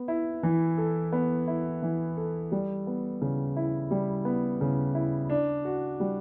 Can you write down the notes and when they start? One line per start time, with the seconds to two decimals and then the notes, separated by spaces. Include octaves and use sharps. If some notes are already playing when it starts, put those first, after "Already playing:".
Already playing: B3
0.08 E4
0.43 E3
0.78 A4
1.13 B3
1.47 E4
1.82 E3
2.17 A4
2.52 G3
2.87 B3
3.21 C#3
3.56 E4
3.91 G3
4.25 B3
4.61 C#3
4.95 E4
5.29 D4
5.65 F#4
6.00 G3